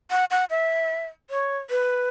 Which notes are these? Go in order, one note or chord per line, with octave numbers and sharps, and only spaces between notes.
F#5
F#5
E5
C#5
B4